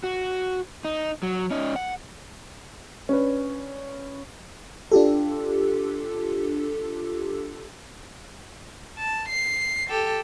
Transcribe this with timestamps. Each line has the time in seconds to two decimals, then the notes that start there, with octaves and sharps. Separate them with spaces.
0.04 F#4
0.85 D#4
1.23 F#3
1.51 C#4 D#4
1.76 F#5
3.09 C#4 D4 B4
4.92 D4 F4 G4 A4
8.98 A5
9.29 C7
9.90 G4 A4